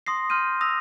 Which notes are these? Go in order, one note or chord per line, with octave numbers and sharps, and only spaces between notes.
C6 D#6 A#6 C7
C6 F6 G6 D#7
D#6 E6 A#6 F7